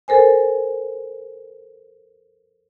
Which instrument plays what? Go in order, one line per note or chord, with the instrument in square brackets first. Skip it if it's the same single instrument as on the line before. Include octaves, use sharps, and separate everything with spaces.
[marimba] A4 A#4 C5 G#5